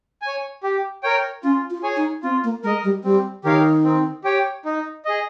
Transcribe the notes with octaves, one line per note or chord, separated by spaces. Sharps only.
C#5 G#5
G4
A#4 C#5 G5
C#4 F4
F4
G#4 C#5 G#5
D#4
C4 F4
A#3
G#3 A#4 D#5
G3
G3 C4
D#3 G4 A#4 C#5 F5
C4
G4 C#5 G5
D#4
G#4 D#5